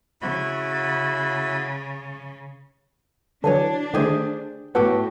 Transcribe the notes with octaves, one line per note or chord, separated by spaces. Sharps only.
C#3 E4 F#4 B5
D3 E3 F#3 D4 C#5 G#5 A5
D3 D#3 A3 G4 G#4 C5
A2 B3 F#4 G4 A4 G5